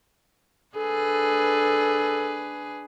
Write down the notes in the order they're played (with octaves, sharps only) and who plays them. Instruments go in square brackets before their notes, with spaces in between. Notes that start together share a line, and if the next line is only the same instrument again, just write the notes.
[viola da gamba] D4 G#4 B4 [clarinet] A4